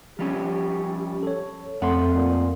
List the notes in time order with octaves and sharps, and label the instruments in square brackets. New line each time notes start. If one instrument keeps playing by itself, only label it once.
[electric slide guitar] F3 G3 C#4 [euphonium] G4
[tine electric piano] A4 C#5
[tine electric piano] F2 C6 [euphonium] A3 [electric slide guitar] C4 F#5
[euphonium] A#2